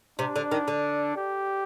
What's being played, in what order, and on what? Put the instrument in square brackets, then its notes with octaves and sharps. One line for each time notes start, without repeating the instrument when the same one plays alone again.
[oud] C3 [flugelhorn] D4
[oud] D3
D#3
D3
[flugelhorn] G4